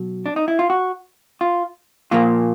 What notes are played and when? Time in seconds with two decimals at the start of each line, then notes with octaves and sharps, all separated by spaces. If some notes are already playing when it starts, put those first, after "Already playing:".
Already playing: B2 F#3
0.26 D4
0.36 D#4
0.48 E4
0.59 F4
0.70 F#4
1.41 F4
2.11 A#2 F3 A#3 F4